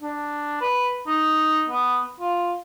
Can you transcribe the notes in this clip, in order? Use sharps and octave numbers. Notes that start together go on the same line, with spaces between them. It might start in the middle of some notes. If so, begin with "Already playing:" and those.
D4
B4
D#4
B3
F4